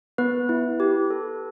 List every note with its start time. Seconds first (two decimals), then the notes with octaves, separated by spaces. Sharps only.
0.18 B3 B4
0.49 E4
0.80 G4
1.10 A4